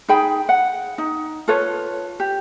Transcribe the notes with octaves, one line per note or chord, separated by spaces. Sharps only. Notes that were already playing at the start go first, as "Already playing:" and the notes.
D#4 G#4 G5 B5
F#5
D#4
F4 A4 B4 C#5
G4